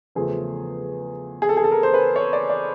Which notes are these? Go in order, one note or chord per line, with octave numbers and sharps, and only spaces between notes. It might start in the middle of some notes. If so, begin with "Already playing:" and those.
E2 C#3 F3 A3 G#4
G#4
A4
G#4
A4
A#4
C5
B4
C#5
D5
D5